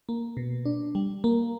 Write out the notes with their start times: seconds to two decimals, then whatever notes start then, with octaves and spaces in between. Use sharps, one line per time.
0.09 A#3
0.37 B2
0.65 D4
0.95 G3
1.24 A#3